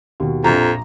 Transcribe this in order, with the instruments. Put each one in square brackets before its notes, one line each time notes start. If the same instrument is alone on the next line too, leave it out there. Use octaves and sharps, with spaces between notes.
[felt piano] D#2 B2
[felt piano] A#1 A#5 [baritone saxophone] F2